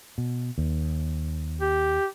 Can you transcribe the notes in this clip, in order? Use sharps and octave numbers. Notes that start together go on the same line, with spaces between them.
B2
D#2
G4